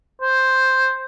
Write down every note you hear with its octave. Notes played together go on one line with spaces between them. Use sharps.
C5